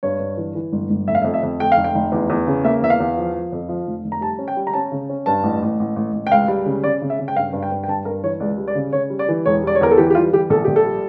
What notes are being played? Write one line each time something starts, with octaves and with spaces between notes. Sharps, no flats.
G2 C#5
G2
E3
E3
G1
G1
F1 E5
F5
F2 E5
E5
F2
A3 G5
F5
F1
G5
F1
E2
E2
C#3
A#3 E5
E2 E5
F5
E2
F3
F3
F2
F3
F1
F1
A#5
G3 A5
C#4
G5
G3
A#5
C#4 A5
C#3
C#4
G2 A5
A1
A1
A1
A1
A1
G5
C#2 F5
G3
C#3
C#3 D5
C#3
E5
C#3
G5
G2 F5
G2
G5
G2
G5
G2 A5
G2 A#4
E3 C#5
C#2 D5
G3
D5
C#3
C#3 C#5
G3
D5
E3
E1 C#5
G3 D5
C#5
E2 A#4
A4
E3 G4
G4
G3 F4
E3 G4
A#1 A4
A#1 G4
A4
G3